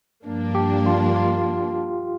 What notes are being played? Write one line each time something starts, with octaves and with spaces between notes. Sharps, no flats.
G2 F3 A#3 D4
G4
F4
F4